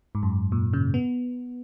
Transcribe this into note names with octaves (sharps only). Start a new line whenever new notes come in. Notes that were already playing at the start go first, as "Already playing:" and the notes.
G#2
F#2
A#2
C#3
B3